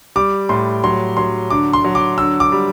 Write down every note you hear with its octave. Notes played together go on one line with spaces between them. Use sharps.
G3 D6
A2 C6
F#3 C6
F#3 C6
D3 D6
C6
F#3
D6
D3 E6
D6
G3